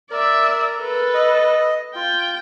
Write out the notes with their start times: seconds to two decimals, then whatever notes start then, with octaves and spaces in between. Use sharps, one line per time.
0.11 A#4 D5 E5
0.79 A4 B4
1.14 D#5
1.95 F4 G5